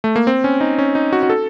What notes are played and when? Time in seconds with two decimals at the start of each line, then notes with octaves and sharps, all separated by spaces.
0.04 A3
0.16 A#3
0.27 C4
0.44 C#4
0.61 D#4
0.78 C#4
0.95 D#4
1.13 F#4
1.23 F#4
1.30 A4